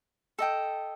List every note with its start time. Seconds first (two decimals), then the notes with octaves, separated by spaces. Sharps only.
0.39 A4 D#5 G5